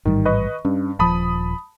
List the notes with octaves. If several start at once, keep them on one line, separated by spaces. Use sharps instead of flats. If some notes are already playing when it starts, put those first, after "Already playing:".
A1 G#2 D#3 G3
B4 D#5 C#6
G2 C#4
D#1 F3 A5 B5 D#6